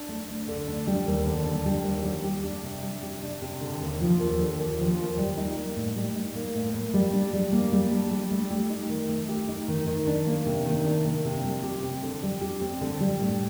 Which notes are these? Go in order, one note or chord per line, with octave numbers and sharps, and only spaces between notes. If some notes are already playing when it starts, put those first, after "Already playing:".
Already playing: D4
A3
D2
D3
D4
G3
D#2
D3
D4
G3
D#2
G3
G4
D4
C3
G3
G4
D4
C3
D3
D#2
F3
D#2
D3
D#2
F3
D#2
G3
D#4
A#3
A2
G3
D#4
A#3
A2
A#3
G3
D4
G3
A#3
G3
D4
G3
A3
G4
D#4
D#3
A3
G4
D#4
D#3
D#3
D4
A#3
C3
D#3
D4
A#3
C3
G3
G4
C4
D3
G3
G4
C4
D3
G3
A2